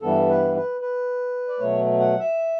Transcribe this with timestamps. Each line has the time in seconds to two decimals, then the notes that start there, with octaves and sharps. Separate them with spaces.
0.02 G2 E3 G3 B3 A4
0.29 B4
0.56 B4
0.81 B4
1.48 D5
1.59 B2 F#3 A3 C#5
2.00 F#5
2.20 E5